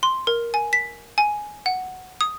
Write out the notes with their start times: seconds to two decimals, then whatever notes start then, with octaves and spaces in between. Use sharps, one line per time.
0.03 C6
0.27 A#4
0.54 G#5
0.73 B6
1.18 G#5
1.66 F#5
2.21 D#6